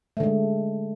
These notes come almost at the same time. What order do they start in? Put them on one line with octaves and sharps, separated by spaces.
A3 D3 G#3